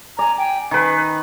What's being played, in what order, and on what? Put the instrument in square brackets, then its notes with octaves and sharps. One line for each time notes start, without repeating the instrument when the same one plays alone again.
[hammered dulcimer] D5 [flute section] G#5 A#5
[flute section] G5 G#5
[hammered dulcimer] D#3 B4 [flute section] G#5